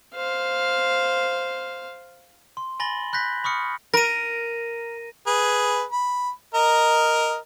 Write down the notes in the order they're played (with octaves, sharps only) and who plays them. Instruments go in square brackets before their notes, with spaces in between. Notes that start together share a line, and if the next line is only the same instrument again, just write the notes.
[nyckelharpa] C5 F5
[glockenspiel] C6
G#5 B5 A6 A#6 F#7 G7
B5 F#6 G6 A#6 B6
B5 C#6 D#6 F6 C#7
[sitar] A#4 [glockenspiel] A#6 D#7
[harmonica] G#4 B4
B5
A#4 D#5